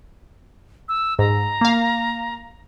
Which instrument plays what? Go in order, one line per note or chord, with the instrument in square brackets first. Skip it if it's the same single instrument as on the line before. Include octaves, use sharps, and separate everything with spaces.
[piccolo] E6
[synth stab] G#2 [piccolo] A#5
[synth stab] A#3 F5